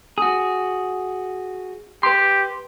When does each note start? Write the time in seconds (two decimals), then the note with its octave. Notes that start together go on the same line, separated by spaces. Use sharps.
0.18 F#4 G#4
2.03 G4 B4 C6